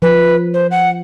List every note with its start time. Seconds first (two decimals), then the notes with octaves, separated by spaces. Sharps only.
0.02 F3 B4
0.54 C5
0.71 F#5